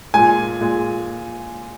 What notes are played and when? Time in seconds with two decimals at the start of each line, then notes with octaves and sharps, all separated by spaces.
0.14 A#2 G#3 G#5
0.61 A#2 G#3